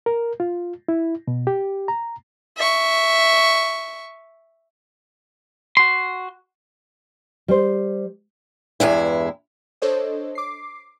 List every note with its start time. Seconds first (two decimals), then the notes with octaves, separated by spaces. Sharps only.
0.06 A#4
0.40 F4
0.88 E4
1.28 B2
1.47 G4
1.88 A#5
2.57 E5 C#6
5.77 F#4 C6
7.48 G3 C5
8.80 E2 G2 G#3 E4
9.82 D4 A4 C5 C#5 D#5
10.35 D6 C7